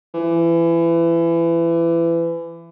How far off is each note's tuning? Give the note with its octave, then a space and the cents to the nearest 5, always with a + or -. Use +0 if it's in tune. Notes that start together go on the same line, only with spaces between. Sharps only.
E3 +25